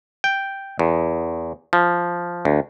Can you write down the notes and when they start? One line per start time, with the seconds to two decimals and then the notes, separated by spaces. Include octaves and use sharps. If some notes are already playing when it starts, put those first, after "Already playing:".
0.24 G5
0.79 E2
1.73 F3
2.45 D2